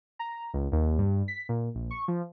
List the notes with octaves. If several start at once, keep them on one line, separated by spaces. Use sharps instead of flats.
A#5
C#2
D#2
G2
B6
A#2
A#1
C#6
F3